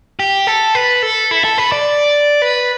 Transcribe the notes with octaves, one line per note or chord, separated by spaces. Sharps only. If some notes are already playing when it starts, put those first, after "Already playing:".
G4
A4
B4
A4
E4
A4
B4
D5
B4